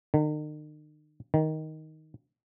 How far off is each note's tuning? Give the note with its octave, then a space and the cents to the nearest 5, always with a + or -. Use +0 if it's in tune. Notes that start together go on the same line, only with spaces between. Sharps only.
D#3 -40
D#3 +10